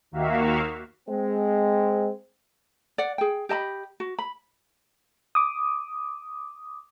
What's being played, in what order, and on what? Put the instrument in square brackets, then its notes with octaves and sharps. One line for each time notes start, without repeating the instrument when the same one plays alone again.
[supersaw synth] D#2 D#3 A#3 F#4 E5 F5
[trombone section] G#3 C4
[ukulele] D5 F#5
G#4 G5
G4 D#5 A5 B5
F#4
B5
[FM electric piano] D6 D#6